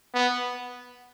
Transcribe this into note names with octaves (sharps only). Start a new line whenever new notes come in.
B3